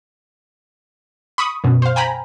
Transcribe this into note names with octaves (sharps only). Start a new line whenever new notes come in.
B5 C#6 D#6
F#2 B2
C5 F5
G5 G#5 A#5 B5